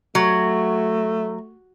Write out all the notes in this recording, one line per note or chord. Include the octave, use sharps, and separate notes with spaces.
F#3 A3